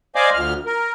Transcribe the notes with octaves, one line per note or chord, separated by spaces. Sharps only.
C5 D5 D#5 F5 G#5 D6
D2 F3 F6
A#4